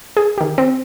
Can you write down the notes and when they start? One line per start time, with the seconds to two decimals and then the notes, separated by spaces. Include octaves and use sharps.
0.17 G#4
0.38 D#3 G4
0.58 C4